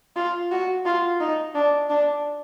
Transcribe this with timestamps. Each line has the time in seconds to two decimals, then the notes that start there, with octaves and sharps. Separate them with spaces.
0.16 F4
0.51 F#4
0.85 F4
1.20 D#4
1.55 D4
1.89 D4